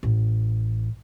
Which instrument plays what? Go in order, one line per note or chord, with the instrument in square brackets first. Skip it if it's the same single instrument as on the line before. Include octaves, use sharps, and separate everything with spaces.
[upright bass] A1